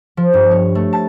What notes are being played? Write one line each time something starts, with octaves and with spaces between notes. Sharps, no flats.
F3
G2
C#5
A3
A5